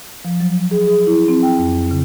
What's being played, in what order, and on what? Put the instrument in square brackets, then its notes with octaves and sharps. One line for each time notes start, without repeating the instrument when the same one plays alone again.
[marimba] F3
F#3
G#4
G#4
E4
C4
G5
F2
C#3